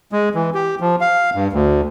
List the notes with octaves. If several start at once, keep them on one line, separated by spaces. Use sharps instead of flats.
G#3
E3
G4
F3
F5
G2
D2